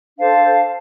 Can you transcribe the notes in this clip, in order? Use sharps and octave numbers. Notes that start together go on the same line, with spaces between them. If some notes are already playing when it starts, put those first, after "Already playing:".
D4 A4 C5 F5 A5